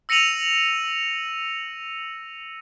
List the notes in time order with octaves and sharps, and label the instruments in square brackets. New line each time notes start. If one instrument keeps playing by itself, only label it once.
[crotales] E6 A#6 C#7 D#7 F7 F#7